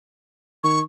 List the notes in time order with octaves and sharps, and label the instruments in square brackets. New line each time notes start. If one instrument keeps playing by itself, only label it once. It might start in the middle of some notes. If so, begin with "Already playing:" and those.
[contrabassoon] D#3 [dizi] C#6